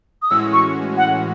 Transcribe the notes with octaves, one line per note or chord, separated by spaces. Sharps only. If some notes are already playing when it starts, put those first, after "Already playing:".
D#6
A2 E3 G#3 C#4 F#4 E6
C#6
F#5